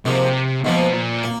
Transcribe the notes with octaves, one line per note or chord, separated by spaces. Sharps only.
G#2 C3 F3 A#3
G#2 B2 F3 A#3
A#2
A#3